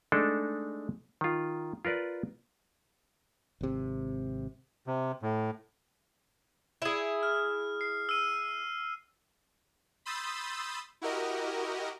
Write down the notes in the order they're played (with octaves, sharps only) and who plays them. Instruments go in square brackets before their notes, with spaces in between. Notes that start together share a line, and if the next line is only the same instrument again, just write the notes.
[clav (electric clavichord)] G#3 A3 D4 D#4 A4
D#3 F4
F4 A#4 B4 D5
[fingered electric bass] G#1 C3
[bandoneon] C3
A2
[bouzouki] E4 G#4
[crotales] F6
C7
E6 D#7
[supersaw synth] B5 C6 D#6 E6 G6 A6
E4 F#4 G4 A#4 D#5